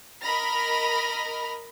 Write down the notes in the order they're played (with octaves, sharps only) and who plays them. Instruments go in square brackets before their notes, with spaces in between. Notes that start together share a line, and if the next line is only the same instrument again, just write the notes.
[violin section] A#4 D#5 B5 F6 A#6